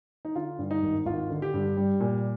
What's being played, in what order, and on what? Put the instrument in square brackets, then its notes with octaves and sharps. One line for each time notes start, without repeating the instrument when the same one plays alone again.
[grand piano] D#4
D3 F4
G2
D#4
G#1
G#1 F4
D3
G4
G2
G3
A#2